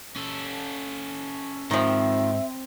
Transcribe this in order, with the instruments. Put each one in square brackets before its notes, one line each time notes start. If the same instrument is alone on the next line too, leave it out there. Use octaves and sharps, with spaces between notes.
[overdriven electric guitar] C#4 A4
[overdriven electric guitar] G#2 [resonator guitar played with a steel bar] D#3 F3 [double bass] C4 [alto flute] E5